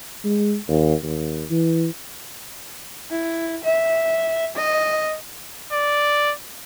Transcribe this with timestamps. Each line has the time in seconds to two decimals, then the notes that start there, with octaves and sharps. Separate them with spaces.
0.24 G#3
0.68 D#2
1.03 D#2
1.50 E3
3.11 E4
3.64 E5
4.56 D#5
5.73 D5